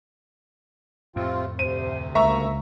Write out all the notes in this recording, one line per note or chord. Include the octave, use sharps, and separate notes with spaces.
F2 A2 C3 C4 F4
D2 C3 C5 D#7
C#2 A#3 E5 A#5 C#6